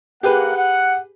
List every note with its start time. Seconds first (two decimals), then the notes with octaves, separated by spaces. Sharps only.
0.23 A#3 G4 G#4 B4 F#5
0.56 F#5